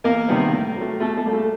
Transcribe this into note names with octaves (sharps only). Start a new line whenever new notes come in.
E2 A#3 A#4
C3 D#3 G3 B3
A2
F#3
A3
B2 A3 A4
A3 A4
G3 A#3
A3 A4